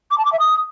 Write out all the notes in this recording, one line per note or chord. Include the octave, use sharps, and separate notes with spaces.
D6
A5
D6
E5
D#6